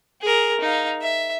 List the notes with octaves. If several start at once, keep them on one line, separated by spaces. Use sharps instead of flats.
G#4 A#4
D#4 F5
E5